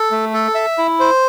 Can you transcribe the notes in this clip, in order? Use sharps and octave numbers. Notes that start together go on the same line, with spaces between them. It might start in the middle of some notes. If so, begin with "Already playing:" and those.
Already playing: A4
A3
A4
E5
E4
C5